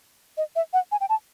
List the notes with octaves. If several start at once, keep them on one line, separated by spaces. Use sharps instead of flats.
D#5
E5
F#5
G#5
G5
A5